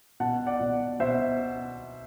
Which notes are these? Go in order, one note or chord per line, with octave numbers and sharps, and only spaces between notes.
B2 F#5 A5
D5 F#5
B2
B2 C5 E5